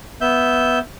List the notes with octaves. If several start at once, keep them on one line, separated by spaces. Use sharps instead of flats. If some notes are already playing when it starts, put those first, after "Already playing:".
B3 E5 G6